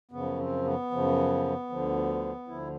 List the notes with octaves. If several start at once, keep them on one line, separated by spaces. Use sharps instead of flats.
F#2 C#3 F3 B3
C4
B3
F#2 C#3 F3
D2 D3 F3
D2 D3 F3 E4